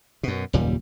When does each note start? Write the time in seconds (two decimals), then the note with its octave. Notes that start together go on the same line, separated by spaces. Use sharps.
0.23 F#2 B2
0.53 F#1 D#2 A#2 G3